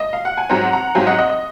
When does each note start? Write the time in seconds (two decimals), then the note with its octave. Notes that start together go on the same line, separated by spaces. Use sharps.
0.00 D#5
0.13 F5
0.25 F#5
0.37 G#5
0.49 G#2 F#3 C4 F#5 A#5
0.72 F#5 A#5
0.95 G#2 F#3 C4 F5 G#5
1.07 D#5 F#5
1.19 D#5
1.29 D#5